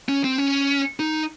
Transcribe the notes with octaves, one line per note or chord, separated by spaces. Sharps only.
C#4
C4
C#4
D#4